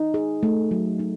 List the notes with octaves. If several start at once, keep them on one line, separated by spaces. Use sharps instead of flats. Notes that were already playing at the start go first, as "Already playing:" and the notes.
Already playing: D#4
G#4
A3
F#3
D#4